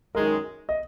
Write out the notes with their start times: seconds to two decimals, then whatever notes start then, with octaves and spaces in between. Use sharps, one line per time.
0.15 F#2 D#3 G#3 D#4 A#4
0.69 D#5